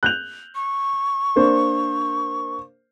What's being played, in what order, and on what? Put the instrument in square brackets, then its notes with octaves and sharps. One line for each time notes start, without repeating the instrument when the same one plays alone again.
[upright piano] F#6 G6 F7
[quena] C#6
[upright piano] A#3 D4 C5